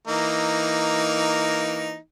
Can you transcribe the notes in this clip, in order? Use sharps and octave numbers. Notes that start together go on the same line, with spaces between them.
E3 A#3 D#4